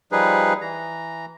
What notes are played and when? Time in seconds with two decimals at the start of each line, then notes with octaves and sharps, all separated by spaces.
0.12 F3 G3 D#4 G#4 B4
0.61 E3 A#5